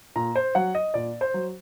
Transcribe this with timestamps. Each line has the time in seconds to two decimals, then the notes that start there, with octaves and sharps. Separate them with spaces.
0.16 A#2 A#5
0.36 C5
0.55 F#3 F#5
0.75 D#5
0.94 A#2 D5
1.21 C5
1.34 F#3